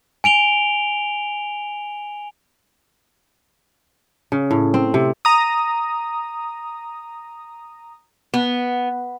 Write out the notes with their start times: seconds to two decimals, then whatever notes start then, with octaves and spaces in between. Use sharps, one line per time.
0.24 G#5 D7 F7 G7
4.32 C#3
4.51 A2
4.74 C4
4.94 C3
5.25 A#5 D#6
8.34 B3